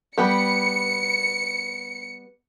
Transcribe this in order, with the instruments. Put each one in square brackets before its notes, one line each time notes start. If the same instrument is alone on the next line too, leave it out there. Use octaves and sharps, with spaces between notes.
[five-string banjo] G3 B3 G4 [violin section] C#7